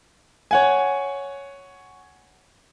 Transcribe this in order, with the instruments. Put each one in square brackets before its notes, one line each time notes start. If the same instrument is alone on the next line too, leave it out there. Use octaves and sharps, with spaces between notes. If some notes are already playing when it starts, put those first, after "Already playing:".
[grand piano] C#5 F#5 G#5